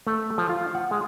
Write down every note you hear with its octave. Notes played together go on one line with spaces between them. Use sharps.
A3
F3
F4
F#5
G#3